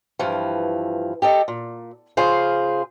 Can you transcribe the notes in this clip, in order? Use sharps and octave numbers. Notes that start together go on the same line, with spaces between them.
G2 E3 F3
G4 A4 D#5
A#2
C#3 F4 G#4 C5